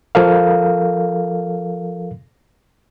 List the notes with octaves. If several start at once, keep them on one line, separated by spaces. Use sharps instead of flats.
F3 A4 A#4 F5